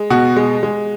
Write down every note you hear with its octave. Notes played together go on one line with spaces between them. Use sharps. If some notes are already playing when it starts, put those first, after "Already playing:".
Already playing: G#3
B2 F#4
G#3
G#3